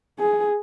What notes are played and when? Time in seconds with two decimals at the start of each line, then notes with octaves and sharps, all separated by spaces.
0.19 G#4